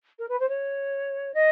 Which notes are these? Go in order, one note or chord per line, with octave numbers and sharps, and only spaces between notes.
A#4
B4
C5
C#5
D#5